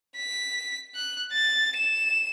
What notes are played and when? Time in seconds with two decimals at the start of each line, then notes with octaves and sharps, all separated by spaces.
0.17 B6
0.95 F#6
1.33 A6
1.76 E7